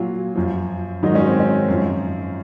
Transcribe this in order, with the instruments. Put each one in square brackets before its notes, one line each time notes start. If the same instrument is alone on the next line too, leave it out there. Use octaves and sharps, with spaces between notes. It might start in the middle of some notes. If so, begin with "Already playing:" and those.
Already playing: [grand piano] A#2 F#3 F4
F#2 F3
G#2 D#3 F#3 D#4
C#4
C4
C#4
F#2 F3